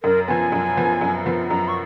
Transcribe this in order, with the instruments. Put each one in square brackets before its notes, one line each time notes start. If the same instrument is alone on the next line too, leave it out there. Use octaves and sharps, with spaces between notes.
[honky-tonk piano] F#2 [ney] A#4
[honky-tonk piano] F3 B3 [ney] G#5
[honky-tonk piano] F#2
F3 B3
F#2
F3 B3
[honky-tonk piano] F#2 [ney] A#5
[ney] C#6